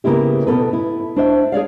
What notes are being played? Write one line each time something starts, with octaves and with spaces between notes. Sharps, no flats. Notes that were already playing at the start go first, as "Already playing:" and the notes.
C#3 A#3 B3 E4 G4
B2 B3 A4 B4
E4
D4 C5 E5
G#4 C#5 D5 F5